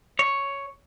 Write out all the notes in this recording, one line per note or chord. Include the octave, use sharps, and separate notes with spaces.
C#5